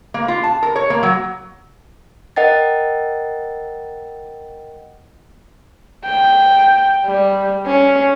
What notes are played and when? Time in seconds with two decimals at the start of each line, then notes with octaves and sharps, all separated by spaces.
0.14 A#3
0.28 F4
0.43 A5
0.63 A#4
0.76 C#5
0.90 A#3
1.03 F#3
2.36 A#4 D#5 F#5 G5 A6
6.05 G5
7.06 G3
7.67 C#4